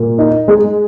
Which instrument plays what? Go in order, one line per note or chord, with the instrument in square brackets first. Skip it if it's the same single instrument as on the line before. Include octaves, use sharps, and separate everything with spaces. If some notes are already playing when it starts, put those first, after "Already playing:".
Already playing: [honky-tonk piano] A#2
D#4
G#3